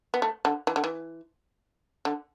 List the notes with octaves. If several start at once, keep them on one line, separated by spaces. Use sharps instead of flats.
B3
A3
D3
E3
D3
E3
D3